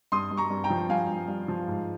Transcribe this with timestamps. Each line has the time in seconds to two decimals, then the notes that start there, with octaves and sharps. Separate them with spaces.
0.12 G2 C6 D#6
0.31 G2
0.37 A#5 C#6
0.50 G2
0.64 G5 A#5
0.70 F3
0.89 G2 F5 G#5
1.09 G2
1.28 G2
1.48 F3
1.68 G#2